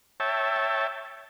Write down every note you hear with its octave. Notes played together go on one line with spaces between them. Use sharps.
C#5 E5 G5 A5